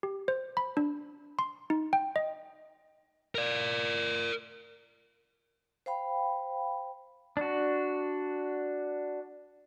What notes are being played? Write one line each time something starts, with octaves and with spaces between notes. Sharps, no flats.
G4
C5
B5
D4
C6
D#4
G5
D#5
A#4 D5
C5 F5 G5 B5
D4 F#4